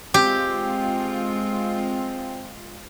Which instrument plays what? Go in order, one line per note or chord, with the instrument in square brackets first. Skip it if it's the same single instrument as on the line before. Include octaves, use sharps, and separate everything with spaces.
[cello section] G#3 F4 [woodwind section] C4 [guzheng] G4